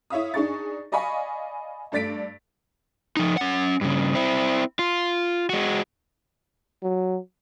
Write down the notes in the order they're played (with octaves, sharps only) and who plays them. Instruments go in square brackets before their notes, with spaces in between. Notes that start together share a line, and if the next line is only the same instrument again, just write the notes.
[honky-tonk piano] E4 C#5 E5 F5 D#6
D4 D#4 G#4 C#6 A6
D5 D#5 F5 G#5 B5 C#6
G2 A3 D5 A6 B6 D7
[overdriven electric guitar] F3 D#4
C#4 F#5
G2 C#3
C4 E4
F4
G#3 F#4
[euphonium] F#3